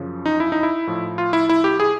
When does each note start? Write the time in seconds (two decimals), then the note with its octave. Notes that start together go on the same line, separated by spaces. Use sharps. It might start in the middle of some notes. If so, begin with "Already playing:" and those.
Already playing: F#2 C#3 F3
0.26 D#4
0.40 E4
0.52 D#4
0.63 E4
0.87 A2 F3
1.18 F4
1.33 E4
1.49 E4
1.64 G4
1.80 G#4